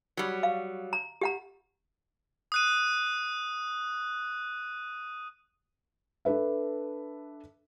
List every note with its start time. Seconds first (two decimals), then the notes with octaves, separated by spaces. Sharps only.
0.17 F#3 G3
0.43 F5
0.93 A#5
1.21 G4 F#5 A#5
2.52 D#6 F#6 D#7
6.25 D4 A4 B4 E5